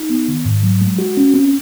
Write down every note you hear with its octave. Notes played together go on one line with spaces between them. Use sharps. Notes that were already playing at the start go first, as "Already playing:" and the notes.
Already playing: D#4
B3
D#3
G#2
F#3
G#3
F#4
C#4
C4